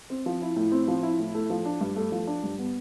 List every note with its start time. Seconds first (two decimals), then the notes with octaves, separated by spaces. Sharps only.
0.10 C4
0.26 F3
0.42 E4
0.56 A2
0.72 C4
0.88 F3
1.03 E4
1.19 A2
1.34 A3
1.50 F3
1.65 D4
1.81 G2
1.96 A3
2.12 F3
2.27 D4
2.43 G2
2.59 B3